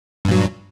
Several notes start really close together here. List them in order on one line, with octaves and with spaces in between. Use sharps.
G2 A#2 F#3